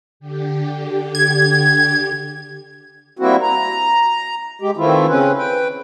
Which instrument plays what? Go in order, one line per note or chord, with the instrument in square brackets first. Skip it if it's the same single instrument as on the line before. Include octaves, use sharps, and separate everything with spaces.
[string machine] D3 G4
[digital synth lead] G#6
[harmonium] G3 A#3 C4 E4 F#4
A#5
G#3 G4
D#3 E3 A3 C4 E4 F4
C#3 C4 C#4 B4
B4 G5